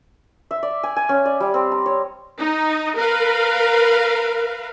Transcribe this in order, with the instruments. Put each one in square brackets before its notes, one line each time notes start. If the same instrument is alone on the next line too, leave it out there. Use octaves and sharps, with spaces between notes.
[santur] E5
D5
G#5
G#5
C#4
D5
G3
C4
A#5
C#5
[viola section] D#4
A#4 B4 F5